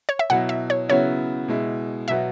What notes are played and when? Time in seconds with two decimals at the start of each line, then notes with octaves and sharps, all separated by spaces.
0.09 C#5
0.19 E5
0.30 B2 F#3 E4 F#5
0.49 E5
0.70 C#5
0.89 C#3 F#3 B3 E4 C#5
1.48 B2 G#3 E4
2.08 B2 F#3 B3 E5